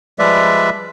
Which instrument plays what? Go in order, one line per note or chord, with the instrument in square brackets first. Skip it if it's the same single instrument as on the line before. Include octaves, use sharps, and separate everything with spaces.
[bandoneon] F3 G3 G#3 B4 D5 E5